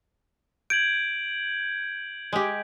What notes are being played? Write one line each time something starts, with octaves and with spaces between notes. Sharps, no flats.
G6 G#6 D7 F#7
G#3 G4